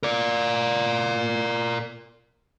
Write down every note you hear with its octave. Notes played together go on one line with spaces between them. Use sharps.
A#4 D5